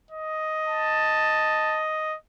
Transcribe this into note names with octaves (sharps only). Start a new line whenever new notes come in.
D#5
A5